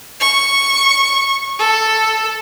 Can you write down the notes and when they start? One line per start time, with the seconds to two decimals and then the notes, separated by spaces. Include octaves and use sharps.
0.20 C#6
1.59 A4